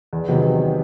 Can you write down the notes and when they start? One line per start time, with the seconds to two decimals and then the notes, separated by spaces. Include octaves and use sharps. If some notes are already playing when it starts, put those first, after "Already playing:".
0.13 E2
0.28 C3 D#3 F#3 B3